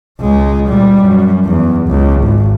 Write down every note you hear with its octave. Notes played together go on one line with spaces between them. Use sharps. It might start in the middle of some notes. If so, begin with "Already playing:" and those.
C#2 G#3
A#2 G3
F#2
E2
C#2
G#1